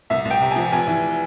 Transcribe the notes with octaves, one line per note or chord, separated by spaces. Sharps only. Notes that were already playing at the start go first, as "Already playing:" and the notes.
C2 E5
C2
G5
C3
G#5
F3
F1 G#5
E3